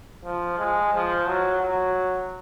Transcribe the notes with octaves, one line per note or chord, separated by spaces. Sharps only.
F3
G#3
F3
F#3
F#3